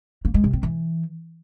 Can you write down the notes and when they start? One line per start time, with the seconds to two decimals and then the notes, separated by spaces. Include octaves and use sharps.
0.25 A#3
0.34 G#3
0.44 C3
0.53 C4
0.63 E3